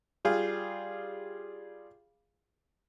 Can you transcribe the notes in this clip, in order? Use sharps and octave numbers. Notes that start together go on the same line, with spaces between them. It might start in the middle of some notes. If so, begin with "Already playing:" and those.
G3 F4 G#4 F5